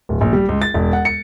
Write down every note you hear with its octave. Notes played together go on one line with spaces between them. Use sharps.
D1
A#1
G3
C#2
A6
E1
F#5
C#7